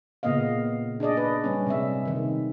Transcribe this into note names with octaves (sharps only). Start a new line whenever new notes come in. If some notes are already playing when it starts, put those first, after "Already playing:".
A#2 C#3 A#3 B3 D#5 F5
D4 G#4 D5 D#5
B4
G3 C#4
C3 G#3 E5
C3 D#3